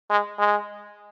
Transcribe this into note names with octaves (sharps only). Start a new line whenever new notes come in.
G#3
G#3